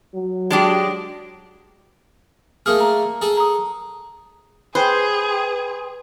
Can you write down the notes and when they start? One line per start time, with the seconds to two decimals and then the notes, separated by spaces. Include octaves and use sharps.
0.14 F#3
0.50 G#3 D4 G4
2.66 A3 A#3 G#4 A#4 D#6 F6
2.80 A#5
3.22 G#4 A4
3.37 A#5 D#6
4.75 G#4 B4 C5 G5 C6